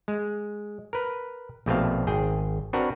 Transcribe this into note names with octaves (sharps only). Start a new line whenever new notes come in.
G#3
A#4 B4
A#1 B2 A3 C4 F5
G#1 G#4 G5
C4 D4 F#4 A#4 B4